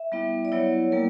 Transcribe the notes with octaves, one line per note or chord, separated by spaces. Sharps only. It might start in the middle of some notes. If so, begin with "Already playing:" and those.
Already playing: E5
G3 B3 E4
D5
F#3 B3 E4 C#5
G3 A#3 A#4